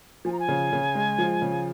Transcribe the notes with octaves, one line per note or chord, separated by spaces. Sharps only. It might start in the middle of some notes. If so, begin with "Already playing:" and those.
F3 G#5
A#5
G#5
C#3
C#3
G#3
F3
C#3